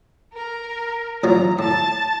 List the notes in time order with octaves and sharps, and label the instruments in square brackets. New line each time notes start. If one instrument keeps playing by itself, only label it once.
[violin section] A#4
[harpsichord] A1 F3 F#3 [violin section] A#5
[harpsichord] A2 [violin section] A5 A6